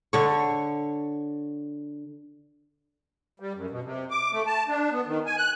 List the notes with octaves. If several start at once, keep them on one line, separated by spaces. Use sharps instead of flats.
D3 C#5
G3
F#2
B2
C3
D6
A3
A5
D4
B3
D#3
G#5
F#6